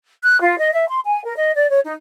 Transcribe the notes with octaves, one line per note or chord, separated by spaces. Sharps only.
F#6
F4
D#5
E5
C6
G#5
A#4
D#5
D5
C#5
D#4